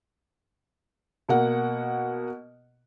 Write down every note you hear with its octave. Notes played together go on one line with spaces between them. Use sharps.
B2 A#3 F#5